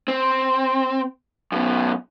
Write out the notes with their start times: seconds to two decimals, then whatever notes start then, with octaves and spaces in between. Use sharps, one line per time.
0.08 C4
1.52 F#2 B2